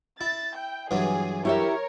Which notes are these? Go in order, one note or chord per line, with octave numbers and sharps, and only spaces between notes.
E4 A6
G5
G2 E3 F#3 G#4
E4 G4 A#4 C#5 E5